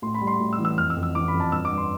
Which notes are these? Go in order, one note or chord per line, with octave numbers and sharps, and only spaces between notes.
A2 C6
B5
G3
C6
A2
E6
E3
E6
F2 F6
E6
F2
E6
E3 D6
B5
F2
A5
G2 E6
D6
G2
C6